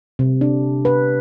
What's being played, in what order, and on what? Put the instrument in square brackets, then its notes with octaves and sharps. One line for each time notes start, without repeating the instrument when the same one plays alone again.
[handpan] C3
D4
B4